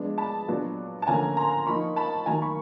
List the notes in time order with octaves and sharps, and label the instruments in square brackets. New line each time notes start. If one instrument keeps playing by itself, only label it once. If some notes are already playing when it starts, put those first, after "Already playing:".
Already playing: [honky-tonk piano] F3 G#3 B3 D4
A5 B5
A#2 F#3 B3 D4
A5
D3 F3 A#3 C#4 G#5 A#5
A#5 C6
F3 A#3 D#4 B5 C#6
A5 B5
D#3 F#3 A#3 G#5 A#5
B5 C#6